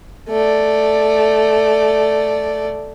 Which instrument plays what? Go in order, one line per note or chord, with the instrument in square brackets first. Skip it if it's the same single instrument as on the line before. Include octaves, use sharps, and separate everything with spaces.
[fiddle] A3 D5